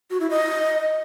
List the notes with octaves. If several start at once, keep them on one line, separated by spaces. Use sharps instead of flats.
F#4
E4
D#5